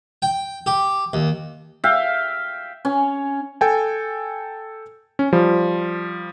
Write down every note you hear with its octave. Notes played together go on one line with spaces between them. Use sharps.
G5
G4
D#2
E5 F5 G5
C#4
A4 G5 G#5
C#4
F3 G3